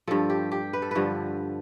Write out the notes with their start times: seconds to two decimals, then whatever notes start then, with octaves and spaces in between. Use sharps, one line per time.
0.07 G2 F3 A4
0.30 G4
0.52 G4
0.73 B4
0.82 A4
0.91 G2 D3 F3 B4